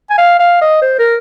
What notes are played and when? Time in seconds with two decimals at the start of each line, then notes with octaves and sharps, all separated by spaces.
0.10 G#5
0.18 F5
0.39 F5
0.62 D#5
0.82 C5
0.99 A#4